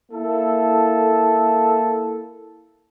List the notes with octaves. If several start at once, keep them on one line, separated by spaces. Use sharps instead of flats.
A#3 E4 A4